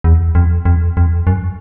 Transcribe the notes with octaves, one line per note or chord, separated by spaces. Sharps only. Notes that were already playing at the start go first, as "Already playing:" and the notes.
E2
F2
F2
F2
F#2